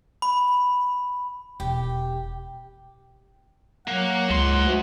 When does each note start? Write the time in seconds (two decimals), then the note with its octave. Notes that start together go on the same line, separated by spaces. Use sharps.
0.22 B5
1.60 E1 G4
3.88 F#3 A#3 F#5
4.30 C#2 G#2 C6
4.65 D2